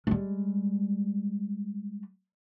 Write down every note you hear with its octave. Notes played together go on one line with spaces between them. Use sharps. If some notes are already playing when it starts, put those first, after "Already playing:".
G3 G#3